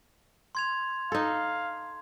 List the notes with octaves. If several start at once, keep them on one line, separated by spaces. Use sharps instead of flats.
C6 G#6 F7
D#4 A4 F5